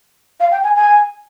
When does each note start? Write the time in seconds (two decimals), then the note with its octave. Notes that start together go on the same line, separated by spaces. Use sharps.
0.40 F5
0.51 G5
0.64 G#5
0.75 G#5